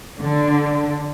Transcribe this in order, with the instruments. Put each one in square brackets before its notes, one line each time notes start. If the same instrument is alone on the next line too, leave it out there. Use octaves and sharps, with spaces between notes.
[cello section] D3